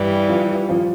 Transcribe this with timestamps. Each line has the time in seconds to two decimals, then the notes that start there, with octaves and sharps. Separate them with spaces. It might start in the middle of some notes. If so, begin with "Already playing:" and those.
Already playing: G2 E3 G3
0.28 F3 F4
0.69 F3 F4